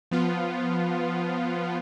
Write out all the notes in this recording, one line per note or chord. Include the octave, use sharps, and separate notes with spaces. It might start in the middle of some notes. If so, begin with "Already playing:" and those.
F3 B3 F4